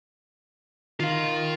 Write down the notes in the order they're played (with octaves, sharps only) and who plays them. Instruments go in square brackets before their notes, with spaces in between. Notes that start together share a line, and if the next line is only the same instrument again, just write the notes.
[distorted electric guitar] D#3 [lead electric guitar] F4 F5